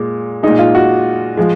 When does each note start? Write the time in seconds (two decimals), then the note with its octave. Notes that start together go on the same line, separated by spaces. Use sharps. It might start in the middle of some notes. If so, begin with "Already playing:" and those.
Already playing: A#2 G#3
0.43 A#2 G#3 D#4
0.59 F4
0.75 F#4
1.37 F3 G#3